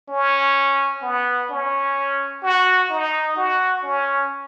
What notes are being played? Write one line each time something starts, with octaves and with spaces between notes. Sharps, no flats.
C#4
B3
C#4
F#4
D#4
F#4
C#4